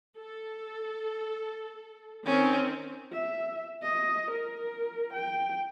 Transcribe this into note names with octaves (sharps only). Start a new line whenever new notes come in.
A4
D#3 C4 C#4
E5
D#5
A#4
G5